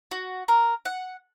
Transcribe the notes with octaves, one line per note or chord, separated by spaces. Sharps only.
F#4
A#4
F#5